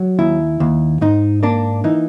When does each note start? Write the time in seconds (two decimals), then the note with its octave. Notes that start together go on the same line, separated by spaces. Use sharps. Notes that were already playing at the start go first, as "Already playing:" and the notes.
Already playing: F#3
0.19 D#2 E4
0.60 D#2
1.01 G#2 D#4
1.43 A#3 D4
1.84 E3 D#4